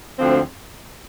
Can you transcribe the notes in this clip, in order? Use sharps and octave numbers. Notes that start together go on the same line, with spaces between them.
D2 D3 F3 C4